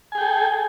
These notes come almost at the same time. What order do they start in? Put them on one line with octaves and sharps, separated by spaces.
G#5 G#4 G5 A4